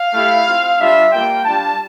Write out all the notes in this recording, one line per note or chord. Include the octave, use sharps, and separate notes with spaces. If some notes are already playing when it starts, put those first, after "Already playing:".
Already playing: F5
A3 E4 G4
C4 F4
G3 D4 F4 E5
G3 A#3 F4 G5
G3 D4 F4 A5